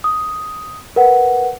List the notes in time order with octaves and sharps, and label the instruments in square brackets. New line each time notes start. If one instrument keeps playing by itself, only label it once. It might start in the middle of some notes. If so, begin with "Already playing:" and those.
[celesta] D#6
A#4 B4 F#5